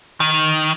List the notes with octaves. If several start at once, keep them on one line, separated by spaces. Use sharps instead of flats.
D#3